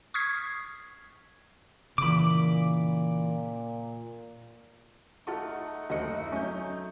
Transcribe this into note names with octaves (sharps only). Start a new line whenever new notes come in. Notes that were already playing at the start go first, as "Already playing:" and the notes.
C#6 D#6 F6 G#6 B6 C7
A#2 C#3 E3 B5 D6
A3 D#4 F4 A4 F#5 C#6
F#1 D2 D#5 C#7
E4
F#3 C#4 G6